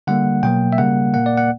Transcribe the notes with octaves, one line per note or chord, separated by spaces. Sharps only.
D3 G3 A#3 F#5
B2 F#3 A#3 G5
E5
C#3 G3 A#3 F#5
A#2 A#3 F#5
D5
F#5